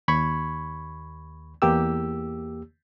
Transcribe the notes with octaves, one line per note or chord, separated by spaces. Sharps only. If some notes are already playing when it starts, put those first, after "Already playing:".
D#2 B5 C#6 G#6
E2 A#3 G4 E6